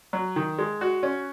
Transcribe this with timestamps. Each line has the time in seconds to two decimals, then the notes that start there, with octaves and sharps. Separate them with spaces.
0.13 F#3
0.36 D#3
0.58 G#3
0.81 F#4
1.03 C#4